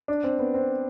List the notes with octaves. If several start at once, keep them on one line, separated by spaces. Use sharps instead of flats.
D4
C4
B3
C4